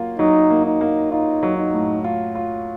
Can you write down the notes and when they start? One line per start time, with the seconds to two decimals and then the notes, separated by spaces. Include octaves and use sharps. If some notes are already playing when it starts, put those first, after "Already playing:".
Already playing: F#3 A#3 F4
0.19 F#3 D#4
0.50 A#3
0.66 D#4
0.81 A#3
1.12 D#4 F4
1.43 F#3
1.58 D#4
1.74 A2
2.04 F4
2.35 F4